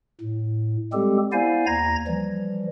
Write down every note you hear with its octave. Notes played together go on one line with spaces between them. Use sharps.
A2
G3 G#3 C4 G4 A4
B3 E4 C5 D5 F5 G#5
D#2 A#5 G#6 A#6
E3 F3 G3